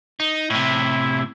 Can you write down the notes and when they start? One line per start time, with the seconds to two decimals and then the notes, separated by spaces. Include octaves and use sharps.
0.20 D#4
0.50 A2 C3 E4